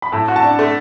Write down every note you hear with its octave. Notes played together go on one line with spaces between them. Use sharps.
B5
A2 A5
F#4
A5
D4
A3